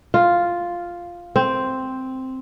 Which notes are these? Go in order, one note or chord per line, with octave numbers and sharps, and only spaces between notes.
F4
C4